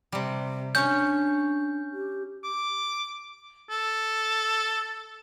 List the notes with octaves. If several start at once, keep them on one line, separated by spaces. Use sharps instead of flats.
C3 G3
C#4 D4 C#5 G6
G4
D6
A4